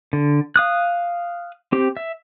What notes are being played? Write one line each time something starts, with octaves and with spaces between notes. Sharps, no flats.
D3
F5 D#6 F#6
C4 G4
E5